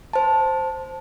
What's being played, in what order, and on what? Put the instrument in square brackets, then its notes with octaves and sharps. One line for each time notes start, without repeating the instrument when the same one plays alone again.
[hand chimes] C5 A5